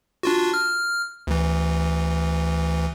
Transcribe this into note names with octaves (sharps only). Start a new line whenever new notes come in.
D4 F4 F#4
F6
D2 E3